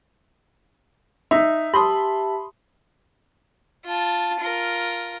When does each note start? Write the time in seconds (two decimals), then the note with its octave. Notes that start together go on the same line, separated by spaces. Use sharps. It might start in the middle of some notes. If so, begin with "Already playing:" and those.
1.31 D#4 E5
1.74 G4 A5 B5 C6 D#6
3.85 F4 A5
4.39 F4 A#4